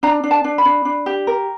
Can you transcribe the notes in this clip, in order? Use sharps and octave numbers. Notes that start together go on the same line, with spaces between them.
D4 A#5
D4
A5
D4
B5
D4
D4
G4
A#4